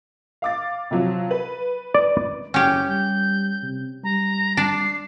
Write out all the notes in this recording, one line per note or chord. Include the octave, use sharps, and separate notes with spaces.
F5 D6 A6
C3 F3 F#3
B4
D5
F#1 C#4 G4 G6
G3 G6
C3
G3 A#5
D4 D5 C7